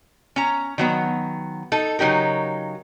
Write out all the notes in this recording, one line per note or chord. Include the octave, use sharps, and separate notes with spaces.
C#4 A#5
D#3 F#3 B3
D#4 A4
C#3 F#3 D#4 G4 A#4